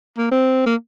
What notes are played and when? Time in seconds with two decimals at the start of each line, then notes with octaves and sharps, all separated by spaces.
0.18 A#3
0.31 C4
0.66 A#3